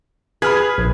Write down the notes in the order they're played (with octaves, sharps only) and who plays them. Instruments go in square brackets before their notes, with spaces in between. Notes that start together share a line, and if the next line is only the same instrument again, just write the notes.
[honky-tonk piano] G#4 [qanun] B4 [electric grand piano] B5 F6 G#6
[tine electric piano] A#1